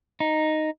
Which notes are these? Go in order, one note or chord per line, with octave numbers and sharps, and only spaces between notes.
D#4